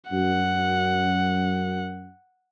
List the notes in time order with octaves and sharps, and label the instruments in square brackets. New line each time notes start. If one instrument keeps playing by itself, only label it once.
[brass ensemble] F#2 [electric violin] F#5